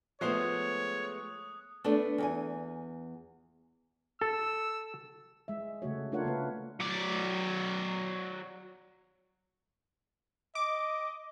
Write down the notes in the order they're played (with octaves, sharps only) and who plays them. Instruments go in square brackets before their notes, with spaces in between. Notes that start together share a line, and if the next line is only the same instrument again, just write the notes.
[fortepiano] F3 C5 [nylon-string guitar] G#3 A3 B3 [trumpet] C#5 [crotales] D#6 F#6
[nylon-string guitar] A3 B3 D4 A4
E2 G5 G#5
[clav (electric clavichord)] A4 [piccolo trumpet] E6
[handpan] G#3 E5
C#3 A3 F#4 C#5
A3 D4 F4 A#4 C#5 F#5
C#3 A#3 B4
[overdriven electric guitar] F#3 D5
[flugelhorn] D#5 [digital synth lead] D6